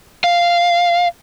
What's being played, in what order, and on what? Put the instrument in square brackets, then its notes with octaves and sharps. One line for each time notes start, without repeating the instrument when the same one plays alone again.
[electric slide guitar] F5